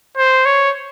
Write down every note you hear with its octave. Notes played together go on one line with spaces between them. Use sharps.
C5
C#5